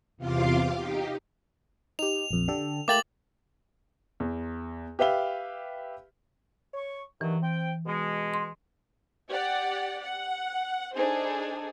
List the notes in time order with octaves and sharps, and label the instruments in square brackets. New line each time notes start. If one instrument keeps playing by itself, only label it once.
[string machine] E2 C3 F4 F5 C6 D6
D#4 G4
[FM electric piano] D#4 G4 [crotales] F7
[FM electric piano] A#1 F2
D3 G4 A4
[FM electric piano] A3 A#3 G4 [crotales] D6 A6 F#7
[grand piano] E2
G4 B4 E5 F5 G7
[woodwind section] C#5 C#6
[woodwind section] G2 D#3 F#3 [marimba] E3
[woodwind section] C4 G5
B2 G#3
[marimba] C6
[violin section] G4 D5 F#5
F#5
D4 D#4 G#4 A4 C5